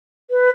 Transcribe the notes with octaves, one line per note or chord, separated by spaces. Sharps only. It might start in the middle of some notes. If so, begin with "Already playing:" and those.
B4